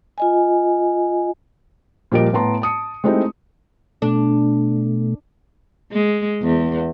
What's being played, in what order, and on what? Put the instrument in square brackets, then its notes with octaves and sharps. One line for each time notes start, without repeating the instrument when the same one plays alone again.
[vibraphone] F4 D#5 G#5
[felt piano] A#2 F3 G3 A#4 D#5 D7
A2 B3 A5 A#5 C6
A5 D#6 C#7
G#3 A3 C4 D#4 E4 G4
[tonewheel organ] B2 A3 [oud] D4
[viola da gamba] G#3
E2